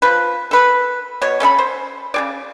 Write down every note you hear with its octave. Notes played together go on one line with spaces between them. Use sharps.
F3 B4
A4 B4
B2 C#5
C#4 A4 E5 B5
C5
C#3 G#4 D5